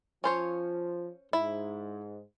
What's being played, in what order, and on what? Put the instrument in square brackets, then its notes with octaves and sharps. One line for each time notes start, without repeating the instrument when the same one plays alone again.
[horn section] F3 [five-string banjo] C#4 C5 C#5
[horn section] G#2 [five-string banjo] E4